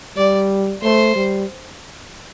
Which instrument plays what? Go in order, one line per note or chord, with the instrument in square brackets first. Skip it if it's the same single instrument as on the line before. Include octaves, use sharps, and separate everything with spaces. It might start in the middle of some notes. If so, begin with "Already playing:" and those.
[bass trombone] G3 [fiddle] D5
[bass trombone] A3 [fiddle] C5
[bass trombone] G3